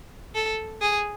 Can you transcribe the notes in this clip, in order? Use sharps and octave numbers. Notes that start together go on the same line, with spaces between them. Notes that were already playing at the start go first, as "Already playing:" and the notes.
A4
G#4